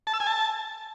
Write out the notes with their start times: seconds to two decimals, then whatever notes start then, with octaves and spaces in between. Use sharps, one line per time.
0.07 A5
0.14 E6
0.20 G#5
0.27 A5